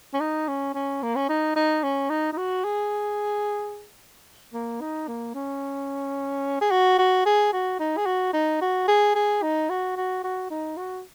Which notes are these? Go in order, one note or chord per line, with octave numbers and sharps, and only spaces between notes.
C#4
D#4
C#4
C#4
A#3
C#4
D#4
D#4
C#4
D#4
D#4
F#4
G#4
A#3
D#4
A#3
C#4
G#4
F#4
F#4
G#4
F#4
D#4
G#4
F#4
D#4
F#4
G#4
G#4
D#4
F#4
F#4
F#4
D#4
F#4